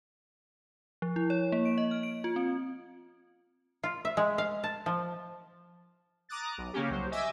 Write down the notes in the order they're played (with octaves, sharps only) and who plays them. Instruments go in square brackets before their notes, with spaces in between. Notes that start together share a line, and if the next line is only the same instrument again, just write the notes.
[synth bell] F3
E4
C#5
A#3
D7
D#5
F6
D7
F4
C4
[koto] F4
E5
G#3
F5
A5
F3
[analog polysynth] A#5 D6 D#6 F#6 A6
B1
C#3 A#3 C#4 G4
C2 F#3 C5
D#5 E5 G#5 D6 E6